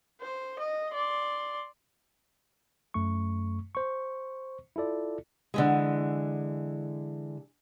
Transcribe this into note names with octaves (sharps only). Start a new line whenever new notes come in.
C5
D#5
D5 C6
F#2 A3 C#6
C5 C#6
E4 F4 A4 D5
D3 E3 G#3